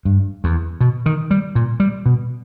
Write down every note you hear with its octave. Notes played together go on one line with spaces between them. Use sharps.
G2
E2
B2
D#3
G3
A#2
G3
B2